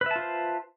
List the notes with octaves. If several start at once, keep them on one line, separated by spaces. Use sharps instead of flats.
F4 B4 C5 E5 A5